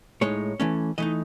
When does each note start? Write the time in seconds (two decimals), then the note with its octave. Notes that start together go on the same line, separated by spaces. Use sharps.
0.21 A2 G#3 D#4 C#5
0.60 E3 A3 C#4
0.98 E3 A3 D#4 D#5